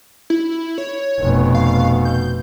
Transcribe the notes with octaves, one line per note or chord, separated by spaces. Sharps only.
E4
C#5
F1 B2
F5
G6